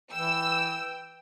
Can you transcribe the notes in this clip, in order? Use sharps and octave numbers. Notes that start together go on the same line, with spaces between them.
E3 G5 E6